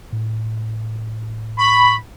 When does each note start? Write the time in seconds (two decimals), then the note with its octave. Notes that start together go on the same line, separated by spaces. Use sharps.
0.13 A2
1.59 B5 C#6